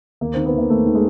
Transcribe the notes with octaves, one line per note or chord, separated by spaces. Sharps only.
D#2 A#3
D#3 C4
B3
D#2 A#3
D#2 A3
D#3
G#3